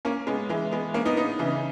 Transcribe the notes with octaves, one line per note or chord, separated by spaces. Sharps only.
A#3 C#4
G#3 B3
E3 G#3
G#3 B3
A#3 C#4
B3 D#4
B3 D#4
C#3 E3